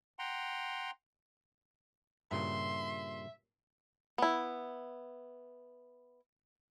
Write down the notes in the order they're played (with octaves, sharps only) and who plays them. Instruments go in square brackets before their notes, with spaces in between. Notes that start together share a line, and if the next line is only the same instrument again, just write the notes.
[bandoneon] F#5 G5 A#5 C6
[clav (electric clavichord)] G2 A#2 C#3 [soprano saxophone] E5 [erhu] C6
[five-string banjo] B3 E4